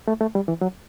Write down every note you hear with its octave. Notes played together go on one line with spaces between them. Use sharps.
A3
A3
G3
E3
F#3